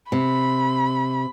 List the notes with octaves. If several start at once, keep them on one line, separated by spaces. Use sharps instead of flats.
C3 B5